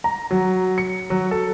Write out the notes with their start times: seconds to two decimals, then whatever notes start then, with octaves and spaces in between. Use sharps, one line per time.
0.04 A#5
0.31 F#3
0.78 C#7
1.10 F#3
1.31 A4